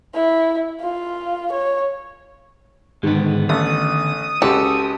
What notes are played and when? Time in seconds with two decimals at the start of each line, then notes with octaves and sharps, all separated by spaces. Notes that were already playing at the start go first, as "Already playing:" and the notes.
0.15 E4
0.81 F4
1.52 C#5
3.03 G#2 D3 D#3 B3
3.49 A1 A3 D#6
4.42 C#2 F#4 G4 A4